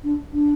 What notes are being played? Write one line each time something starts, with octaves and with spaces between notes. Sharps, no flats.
D4
D4